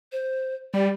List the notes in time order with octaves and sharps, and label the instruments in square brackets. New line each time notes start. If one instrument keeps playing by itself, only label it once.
[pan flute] C5
[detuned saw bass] G3 [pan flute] D5